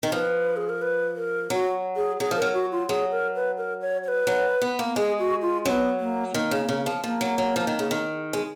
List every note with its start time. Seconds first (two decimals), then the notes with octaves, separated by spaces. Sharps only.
0.03 D#3
0.12 F3 B4
0.57 G#4
0.69 A#4
0.82 B4
1.16 A#4
1.50 F#3 F#4
1.96 G#4
2.20 F#3 G#4
2.31 F3
2.36 A#4
2.42 F#3
2.54 F#4
2.72 F4
2.89 F#3 G#4
3.11 A#4
3.35 B4
3.57 A#4
3.81 C#5
4.04 C#5
4.08 B4
4.27 F#3
4.62 B3
4.79 A#3
4.96 G#3 G#4
5.19 F#4
5.42 F4
5.65 F#3 B3 C#4
6.00 A#3
6.34 D#3 A#3
6.51 C#3
6.69 C#3
6.86 F3
7.03 F3 A#3
7.21 F#3
7.38 F#3
7.56 F3
7.67 D#3
7.79 C#3
7.91 D#3
8.33 G#3